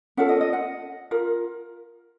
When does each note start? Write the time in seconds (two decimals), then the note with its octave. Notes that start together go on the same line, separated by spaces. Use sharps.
0.17 C#4 F4 A4 F#5
0.29 D#5
0.41 D#5
0.53 F#5
1.11 F4 A#4